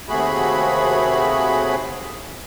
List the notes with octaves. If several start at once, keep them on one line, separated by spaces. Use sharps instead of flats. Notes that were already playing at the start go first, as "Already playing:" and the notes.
D#2 C3 A3 F#4 G#4 B5